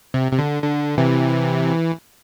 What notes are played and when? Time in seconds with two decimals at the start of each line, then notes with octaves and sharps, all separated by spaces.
0.14 C3
0.32 C3
0.39 D3
0.63 D3
0.98 C3 E3